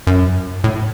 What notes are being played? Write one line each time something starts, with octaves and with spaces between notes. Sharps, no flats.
F#2
A2